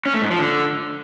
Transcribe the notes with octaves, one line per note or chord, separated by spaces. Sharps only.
C#4
A3
G#2
F3
D3